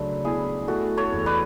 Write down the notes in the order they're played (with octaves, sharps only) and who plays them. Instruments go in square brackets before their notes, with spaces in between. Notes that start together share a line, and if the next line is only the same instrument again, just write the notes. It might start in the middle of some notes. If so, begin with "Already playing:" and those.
Already playing: [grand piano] C#2 F#3 A3 [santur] D4 B4
[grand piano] B2 [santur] E4 G#4
[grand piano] A3 [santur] F#4 A4
[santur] A4 C#5
[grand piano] E2
[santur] B4 D5